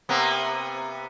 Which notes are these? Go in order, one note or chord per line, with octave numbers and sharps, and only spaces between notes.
C3 A#3 B3